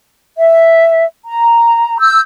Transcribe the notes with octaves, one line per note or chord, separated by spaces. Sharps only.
E5
A#5
E6 G6